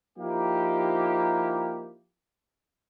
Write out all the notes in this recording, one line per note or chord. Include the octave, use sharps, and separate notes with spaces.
F3 A#3 D#4 E4 G4